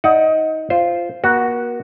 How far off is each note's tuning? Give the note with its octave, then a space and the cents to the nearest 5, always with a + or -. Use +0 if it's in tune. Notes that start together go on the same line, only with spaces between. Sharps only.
D#4 +25 D5 +20 F#5 +0
F4 -15 C5 -5
A#3 +40 F#4 +0